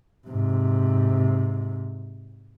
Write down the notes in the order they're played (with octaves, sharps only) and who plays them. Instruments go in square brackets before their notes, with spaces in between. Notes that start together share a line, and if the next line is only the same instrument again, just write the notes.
[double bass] G#2 C3